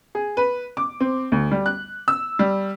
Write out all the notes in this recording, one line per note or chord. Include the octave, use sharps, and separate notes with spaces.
G#4
B4
D6
C4
D2
G3
F#6
E6
G3